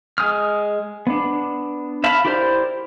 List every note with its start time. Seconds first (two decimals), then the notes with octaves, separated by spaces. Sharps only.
0.18 G#3 G#5 D#6 F6
1.07 B3 D4
2.04 E5 F5 A5 B5
2.25 E4 G4 A#4 C5 D5